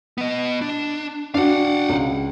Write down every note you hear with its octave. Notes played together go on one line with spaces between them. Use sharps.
B3 D#5
D4
D4 F#4 F5 F#5
C#2